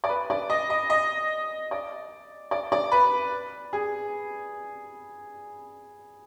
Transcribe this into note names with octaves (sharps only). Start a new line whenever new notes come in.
D5
B4
D5
D#5
D#5
D#5
D5
D5
D5
B4
G#4